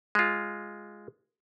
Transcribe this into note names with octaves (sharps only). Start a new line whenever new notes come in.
G#3 F4